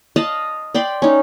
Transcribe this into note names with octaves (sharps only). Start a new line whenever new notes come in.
D#5 F5 A5 B5
D5 G5 B5 C6
C#4 D#4